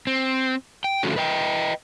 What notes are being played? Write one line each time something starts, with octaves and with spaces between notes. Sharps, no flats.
C4
G5
D3 F3 A3 C#4 F#4
B4 D#5 G5